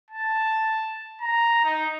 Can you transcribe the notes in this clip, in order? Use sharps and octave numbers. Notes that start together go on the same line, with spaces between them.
A5
A#5
D#4